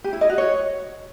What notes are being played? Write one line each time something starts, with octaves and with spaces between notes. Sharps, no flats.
G4
E4
D#5
F#4
C#5